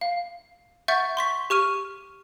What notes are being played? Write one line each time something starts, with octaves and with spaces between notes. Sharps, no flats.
F5
E5 F#5 C#6 G6 A6
C6 C#6 B6
G4 C#6 F6 D#7